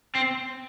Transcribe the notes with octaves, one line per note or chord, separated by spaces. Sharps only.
C4